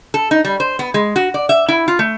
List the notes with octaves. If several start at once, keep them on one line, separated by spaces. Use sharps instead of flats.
A4
D#4
G3
C5
B3
G#3
F#4
D5
E5
E4
F4
A3